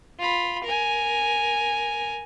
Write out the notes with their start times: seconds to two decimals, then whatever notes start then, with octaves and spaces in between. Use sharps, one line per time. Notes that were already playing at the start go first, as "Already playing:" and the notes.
0.19 F4 B5
0.64 A#4 G#5